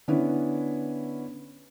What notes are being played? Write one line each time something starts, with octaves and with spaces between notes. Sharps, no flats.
D3 B3 C#4 D4 E4